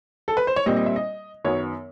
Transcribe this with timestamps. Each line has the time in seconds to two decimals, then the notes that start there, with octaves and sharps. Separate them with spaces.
0.28 A4
0.37 B4
0.47 C5
0.56 C#5
0.66 A#2 G3 C4 D#5
0.76 D#5
0.86 E5
0.96 D#5
1.44 F#2 D#3 F#3 B3 C#5